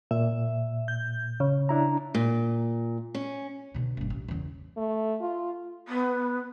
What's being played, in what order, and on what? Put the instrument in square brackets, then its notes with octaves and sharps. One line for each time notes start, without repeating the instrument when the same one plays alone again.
[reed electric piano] A#2 [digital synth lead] E5
[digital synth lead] G6
C#3
[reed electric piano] D4 E4 A#5
[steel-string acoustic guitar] A#2
C#4
[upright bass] B2 D3
F#1 G2
A1
E2 C#3
[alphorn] A3
F4
[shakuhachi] B3